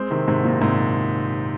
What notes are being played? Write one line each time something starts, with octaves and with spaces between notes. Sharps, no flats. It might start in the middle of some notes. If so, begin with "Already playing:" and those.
Already playing: G#3 C4
C3 D#3
G#2 C3
A#2
G#2 C3